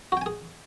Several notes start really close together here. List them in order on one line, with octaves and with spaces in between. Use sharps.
F#4 G5 G#5 G#4